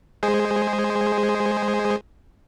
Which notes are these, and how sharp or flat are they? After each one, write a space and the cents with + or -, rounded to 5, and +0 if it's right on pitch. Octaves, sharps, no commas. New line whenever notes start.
G#3 +0 G#4 -5 C5 +0